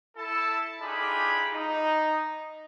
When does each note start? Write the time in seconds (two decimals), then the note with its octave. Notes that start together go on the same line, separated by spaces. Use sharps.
0.16 E4 A4 A5
0.81 D4 D#4 F4 G4 G#4 B5
1.52 D#4